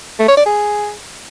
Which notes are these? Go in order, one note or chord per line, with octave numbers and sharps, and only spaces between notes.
A3
C#5
D5
G#4